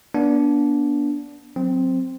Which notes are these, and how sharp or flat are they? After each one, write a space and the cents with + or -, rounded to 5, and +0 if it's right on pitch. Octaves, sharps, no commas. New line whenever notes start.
B3 -40 D4 -20
F#3 -10 C4 +0